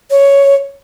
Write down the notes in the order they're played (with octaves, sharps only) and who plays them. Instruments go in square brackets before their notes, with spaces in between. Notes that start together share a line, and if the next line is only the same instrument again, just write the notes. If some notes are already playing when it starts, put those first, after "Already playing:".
[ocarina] C#5